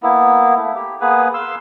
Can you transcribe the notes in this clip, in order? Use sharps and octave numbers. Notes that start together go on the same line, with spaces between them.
A#3 B3 E4
A3
G4
A#3 B3 G#4 B4
F5 C6 E6